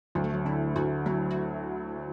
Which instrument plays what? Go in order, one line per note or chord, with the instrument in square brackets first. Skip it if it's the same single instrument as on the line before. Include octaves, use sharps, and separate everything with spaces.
[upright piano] D2 [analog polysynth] F#3
[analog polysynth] A3
F#3
[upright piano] D3 [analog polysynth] E4
[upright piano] D2 [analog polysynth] F#4
[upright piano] F#3 [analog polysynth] E4
[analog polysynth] F#4